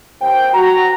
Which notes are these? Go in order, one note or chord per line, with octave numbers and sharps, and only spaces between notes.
D#2 C5 G5
F#4 A#5